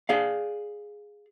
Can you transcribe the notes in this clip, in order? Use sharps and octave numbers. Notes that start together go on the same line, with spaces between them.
G#4 D5 F5